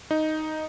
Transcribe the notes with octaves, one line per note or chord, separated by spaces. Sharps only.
D#4